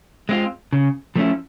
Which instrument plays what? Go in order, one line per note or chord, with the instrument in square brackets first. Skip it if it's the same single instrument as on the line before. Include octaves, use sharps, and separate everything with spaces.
[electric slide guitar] G#3 C4 F4
C#3
F3 A3 C#4 E4